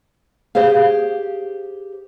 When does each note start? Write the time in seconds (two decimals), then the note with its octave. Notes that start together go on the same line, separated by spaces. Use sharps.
0.55 G4 G#4 C5 F5